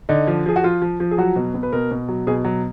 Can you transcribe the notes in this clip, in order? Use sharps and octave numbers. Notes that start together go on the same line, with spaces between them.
D3 D#4
F3
F3 G#4
F#4
F3 F4
F3
F3
G#4
F#3 F#4
B2
B2
B4
B2 A#4
B2
F#3
B2 G#4
F#3